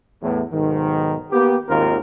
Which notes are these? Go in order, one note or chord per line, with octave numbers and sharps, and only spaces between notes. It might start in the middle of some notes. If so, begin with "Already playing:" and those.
E2 A2
B1 G#2 D#3
A#3 B3 G4
G#1 D#2 C4 F4 A#4